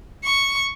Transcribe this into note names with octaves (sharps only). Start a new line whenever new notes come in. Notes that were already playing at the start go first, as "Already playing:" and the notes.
C#6